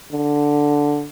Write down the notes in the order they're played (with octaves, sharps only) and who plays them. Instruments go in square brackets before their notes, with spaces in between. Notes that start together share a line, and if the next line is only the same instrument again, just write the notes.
[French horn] D3